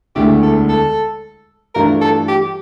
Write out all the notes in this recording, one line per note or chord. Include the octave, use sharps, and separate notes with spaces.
E1 D2 D3 A3 E4 G4
A4
A4
G2 E3 A3 D4 F4 A#4
A4
G4